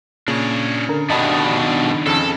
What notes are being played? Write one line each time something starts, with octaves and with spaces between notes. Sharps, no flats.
A#2 C#3 D4 C#5
D3 A#4
G2 B2 D#3 D4 D#5 A5 B5
F2 C#3 A4